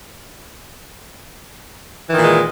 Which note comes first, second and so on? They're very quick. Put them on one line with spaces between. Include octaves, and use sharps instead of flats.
E3 D#3 A#2 G#3